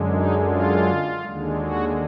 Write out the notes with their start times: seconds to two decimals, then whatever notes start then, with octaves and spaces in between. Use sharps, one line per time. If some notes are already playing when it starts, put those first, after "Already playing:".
Already playing: F#2 D3 G#3
0.08 D#4
0.46 F4
1.21 D#2 D3 G#3
1.58 F#4